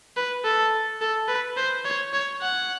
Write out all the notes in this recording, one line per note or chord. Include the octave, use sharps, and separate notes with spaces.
B4
A4
A4
B4
C5
C#5
C#5
F#5